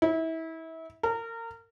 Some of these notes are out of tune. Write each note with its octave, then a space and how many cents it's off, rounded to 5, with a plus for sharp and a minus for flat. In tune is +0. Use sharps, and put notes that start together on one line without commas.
E4 -30
A#4 -30